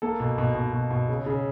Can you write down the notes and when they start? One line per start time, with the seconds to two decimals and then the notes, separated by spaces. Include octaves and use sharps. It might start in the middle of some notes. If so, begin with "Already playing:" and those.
0.02 A#3 A4
0.20 B2
0.38 B2
0.55 B2
0.73 B2
0.91 B2
1.08 C#3
1.26 C#3